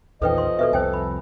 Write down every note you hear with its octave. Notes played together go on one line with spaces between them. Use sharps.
A#1 E2 D#3 F3 A4 B4 D#5 G5
C6
B2 A4 B4 E5
C2 F2 A4 C5 G5 G#5
B5